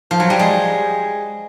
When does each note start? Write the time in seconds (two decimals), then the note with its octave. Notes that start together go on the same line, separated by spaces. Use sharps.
0.11 F3
0.20 F#3
0.30 G3
0.39 G#3